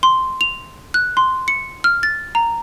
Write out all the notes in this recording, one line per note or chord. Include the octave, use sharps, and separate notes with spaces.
C6
F7
F#6
C6
C#7
F6
A6
A#5